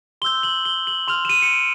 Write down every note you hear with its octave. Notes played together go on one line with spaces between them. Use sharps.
C6 E6 G6 G7
F#7
G7
F#7
C6 F6 F7
E7
D#7
C#7
D7